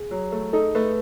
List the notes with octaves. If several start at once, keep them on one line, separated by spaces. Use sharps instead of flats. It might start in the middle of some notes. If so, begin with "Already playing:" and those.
Already playing: G#4
F#3
A3
D#4 A4
A3 B4